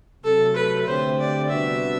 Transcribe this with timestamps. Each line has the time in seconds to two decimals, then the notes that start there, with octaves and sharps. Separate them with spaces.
0.24 C3 F#3 A3 A4
0.56 B4
0.87 D3 A3 C4 G4 C5
1.19 D5
1.50 C3 G3 B3 D4 F#4 E5